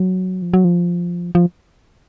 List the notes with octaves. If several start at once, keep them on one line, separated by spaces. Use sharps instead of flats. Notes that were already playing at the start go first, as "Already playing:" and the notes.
Already playing: F#3
F3
F#3
F3
F3